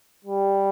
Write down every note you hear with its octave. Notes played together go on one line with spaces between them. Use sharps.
G3